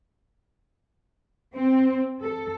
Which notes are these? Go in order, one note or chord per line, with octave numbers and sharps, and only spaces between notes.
C4
A4